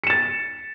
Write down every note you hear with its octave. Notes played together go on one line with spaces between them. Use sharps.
A6 C#7 E7